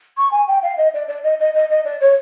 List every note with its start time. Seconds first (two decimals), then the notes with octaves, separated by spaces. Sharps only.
0.17 C#6
0.31 G#5
0.48 G5
0.63 F5
0.77 D#5
0.94 D5
1.08 D5
1.23 D#5
1.39 D#5
1.54 D#5
1.70 D#5
1.85 D5
2.01 C#5